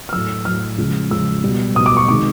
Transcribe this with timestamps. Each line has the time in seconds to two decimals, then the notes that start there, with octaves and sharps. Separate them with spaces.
0.09 F6
0.13 A2 F#3 E6
0.45 A2 F#3 F6
0.78 C#3 F3 G#3
1.10 C#3 F3 G#3 E6
1.44 B2 G3
1.75 B2 D#6
1.80 G3
1.86 D6
1.97 C#6
2.08 C3 D#3 G#3 D6